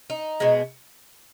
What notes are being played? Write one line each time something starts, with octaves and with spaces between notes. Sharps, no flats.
D#4
B2 G#3 B3